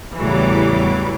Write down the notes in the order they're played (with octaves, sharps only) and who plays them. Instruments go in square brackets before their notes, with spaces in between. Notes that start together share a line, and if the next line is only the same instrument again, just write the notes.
[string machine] E2 G3 D6 [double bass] A2 C#3 [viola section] E3 F#3